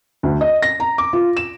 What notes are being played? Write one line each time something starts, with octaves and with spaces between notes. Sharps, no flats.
D2
D#5
A#6
A#5
D6
F4
E7